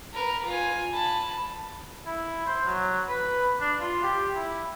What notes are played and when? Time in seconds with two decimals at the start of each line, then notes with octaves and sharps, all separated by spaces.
0.14 A#4 B4
0.47 F4 G#5
0.94 A5 B5
2.06 E4
2.46 C5
2.65 F#3
3.08 B4
3.60 D4
3.80 F4
4.03 G4
4.35 E4